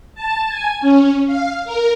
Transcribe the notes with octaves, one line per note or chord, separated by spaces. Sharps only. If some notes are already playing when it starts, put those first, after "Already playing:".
A5
G#5
C#4
F5
A#4